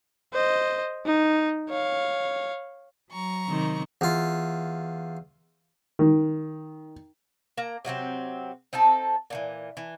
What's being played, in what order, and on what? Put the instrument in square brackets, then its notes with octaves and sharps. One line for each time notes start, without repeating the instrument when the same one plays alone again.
[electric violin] C5 D#5
D#4
C#5 F5
[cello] F#3 [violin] A#5 C#6
[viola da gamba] C3 D#3 C4
[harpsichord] E2 F4
[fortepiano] D#3
[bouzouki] A#3 A#5
C3 F#3 A#3 C4
C4 D#4 A4 A5
A#2 D#3 E3
E3